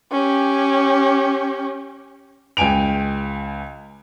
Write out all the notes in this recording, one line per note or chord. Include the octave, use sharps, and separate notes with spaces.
C#4 G4
C#2 G5 G#5 D7 F7